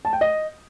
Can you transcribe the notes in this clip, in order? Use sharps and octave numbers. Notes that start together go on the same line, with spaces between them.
A5
G5
D#5